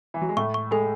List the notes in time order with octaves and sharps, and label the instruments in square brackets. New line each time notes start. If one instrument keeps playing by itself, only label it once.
[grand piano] E3
F#3
G#3
[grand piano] A2 A3 [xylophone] C#6
[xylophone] C#6
[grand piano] G#3 [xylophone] A4